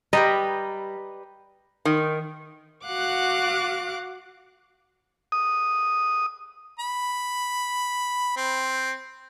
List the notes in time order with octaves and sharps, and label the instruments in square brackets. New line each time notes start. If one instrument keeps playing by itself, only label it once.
[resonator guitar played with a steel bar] G3 [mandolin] G4 B4 A#5 [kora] D#5
[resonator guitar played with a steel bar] D#3
[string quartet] F#4 F5 F#5 D6 F#6
[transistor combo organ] D#6
[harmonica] B5
C4